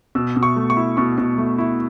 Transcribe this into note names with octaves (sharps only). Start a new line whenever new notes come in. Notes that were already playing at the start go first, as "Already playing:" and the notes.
B2 E6
B2
C#6
A3
C#6
E4
B2 C#6
B2
A3
E4